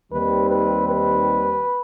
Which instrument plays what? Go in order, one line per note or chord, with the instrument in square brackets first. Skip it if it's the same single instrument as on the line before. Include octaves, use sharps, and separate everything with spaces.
[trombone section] D#2 D#3 G3 C4 B4
B4
B4